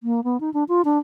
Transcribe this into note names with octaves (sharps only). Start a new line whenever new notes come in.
A#3
B3
D#4
D4
F4
D4